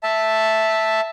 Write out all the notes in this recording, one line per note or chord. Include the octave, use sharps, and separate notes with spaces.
E5 A5